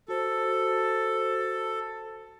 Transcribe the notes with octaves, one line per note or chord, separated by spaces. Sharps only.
F#4 A4 C5